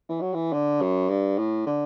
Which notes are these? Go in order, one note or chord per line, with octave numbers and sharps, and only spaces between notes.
E3
F#3
E3
D3
F#2
G2
A2
D3